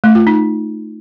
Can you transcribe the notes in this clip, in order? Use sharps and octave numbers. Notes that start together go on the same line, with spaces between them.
A3
F4
D#4